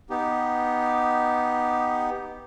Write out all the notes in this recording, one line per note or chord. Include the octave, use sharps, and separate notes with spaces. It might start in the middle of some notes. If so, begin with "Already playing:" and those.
B3 D#4 G4